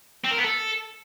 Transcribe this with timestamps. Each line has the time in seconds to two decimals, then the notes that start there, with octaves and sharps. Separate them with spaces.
0.25 C4
0.31 A#4
0.38 B3
0.44 A4